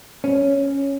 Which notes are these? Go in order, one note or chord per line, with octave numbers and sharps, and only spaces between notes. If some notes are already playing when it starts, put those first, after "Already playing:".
C#4